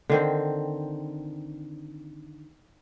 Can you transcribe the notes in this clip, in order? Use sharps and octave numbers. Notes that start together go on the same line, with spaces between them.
D3 D#3 C4